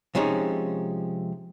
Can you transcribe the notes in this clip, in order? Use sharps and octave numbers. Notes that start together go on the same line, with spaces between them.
C3 F3 G#3 C#4 D#4